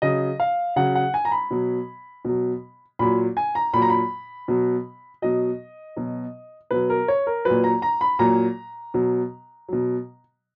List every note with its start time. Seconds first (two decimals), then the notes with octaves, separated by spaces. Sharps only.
0.02 C#3 F#3 D#5
0.40 F5
0.76 C#3 F#3 F#5
0.95 F#5
1.14 G#5
1.25 A#5
1.32 B5
1.51 B2 F#3
2.25 B2 F#3
2.99 A#2 F#3 B5
3.37 G#5
3.55 A#5
3.73 A#2 B5
3.77 F#3
3.82 A#5
3.90 B5
4.48 B2 F#3
5.22 B2 F#3 D#5
5.96 B2 F#3
6.71 B2 F#3 B4
6.90 A#4
7.08 C#5
7.27 A#4
7.45 A#2 F#3 B4
7.64 A#5
7.82 A#5
8.01 B5
8.19 A#2 F#3 A#5
8.94 B2 F#3
9.68 B2 F#3